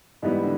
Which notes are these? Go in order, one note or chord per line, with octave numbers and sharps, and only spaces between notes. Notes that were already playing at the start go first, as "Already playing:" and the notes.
G#2 E3 G3 B3
D3 D4